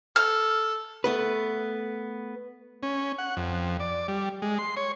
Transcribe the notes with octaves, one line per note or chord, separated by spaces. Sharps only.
A4 F6
A3 B3 B4
C#4
F#5
F2
D5
G3
G#3
C6
C#5